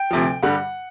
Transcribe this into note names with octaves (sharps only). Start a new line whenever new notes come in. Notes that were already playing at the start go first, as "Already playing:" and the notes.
Already playing: G5
D2 C3 F3
G2 D3 G3 F#5